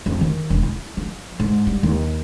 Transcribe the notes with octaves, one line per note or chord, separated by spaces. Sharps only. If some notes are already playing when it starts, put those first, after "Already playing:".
F2
D#3
E1
E4
F3
G#2
G3
D#2